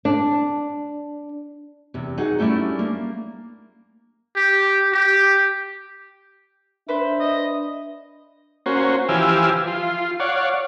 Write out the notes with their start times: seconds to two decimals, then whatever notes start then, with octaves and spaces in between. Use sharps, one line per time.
0.05 D4
1.94 E2 C3
2.17 D#4 F#4 G#4 F#5
2.39 G3 A3 C#4 D4 E4
2.79 A#3
4.36 G4
4.93 G4
6.89 D4 B4 C5 E5
7.20 D#5
8.66 A#3 C#4 F#4 C5
9.09 E3 F3 G4 G#5 E6 F6
9.67 F4
10.20 C#5 D5 F5 F#5